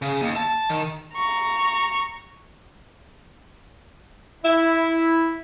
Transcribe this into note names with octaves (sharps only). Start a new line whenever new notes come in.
C#3
D#2
A5
D#3
A#5 C#6
E4